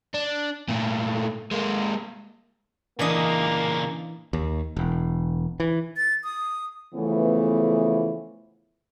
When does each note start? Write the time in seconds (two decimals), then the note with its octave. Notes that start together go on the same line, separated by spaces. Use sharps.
0.14 D4
0.68 A#2 A3
1.51 G#3 A#3
2.99 A#2 C#3 E3 A#3 D4 D#5
4.33 D#2
4.77 E1
5.60 E3
5.97 A6
6.24 D#6
6.95 C#3 E3 F3 A3 B3